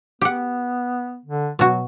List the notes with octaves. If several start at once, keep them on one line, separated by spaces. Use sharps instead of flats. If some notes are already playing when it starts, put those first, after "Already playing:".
B3 G4 F#5
D3
B2 F#3 F#4